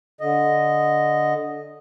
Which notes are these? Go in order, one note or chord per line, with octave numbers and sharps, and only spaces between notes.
D3 D#5